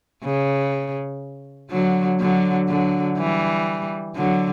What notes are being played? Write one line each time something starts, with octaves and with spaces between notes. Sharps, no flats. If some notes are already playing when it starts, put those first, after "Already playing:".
C#3
D3 F#3
D3 F#3
D3 F#3
E3 G3
D3 F#3